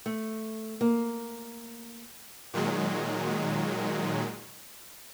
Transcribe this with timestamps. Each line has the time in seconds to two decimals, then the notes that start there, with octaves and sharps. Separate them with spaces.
0.06 A3
0.81 A#3
2.54 A#2 D#3 F#3 G#3